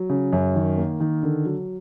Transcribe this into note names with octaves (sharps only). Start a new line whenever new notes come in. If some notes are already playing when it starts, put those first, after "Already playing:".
Already playing: F#3
C#3
F#2
D#3
A#3
D#3
D3
F#3